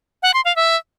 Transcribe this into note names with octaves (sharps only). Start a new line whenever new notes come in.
F#5
C6
F5
E5